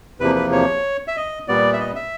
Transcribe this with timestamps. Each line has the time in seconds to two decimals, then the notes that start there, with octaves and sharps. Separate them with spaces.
0.20 E2 C3 F3 A#3 B4
0.35 B4
0.52 C#5
1.08 E5
1.16 D#5
1.48 A#2 G3 B3 D5
1.73 E5
1.80 D#5
1.95 E5